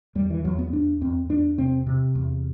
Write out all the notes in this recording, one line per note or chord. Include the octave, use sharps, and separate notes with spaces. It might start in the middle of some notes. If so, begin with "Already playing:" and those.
E2 G3
E3
E2 F#3
B3
E2 D4
E2 C4
E2 D4
C3 C4
C3
E2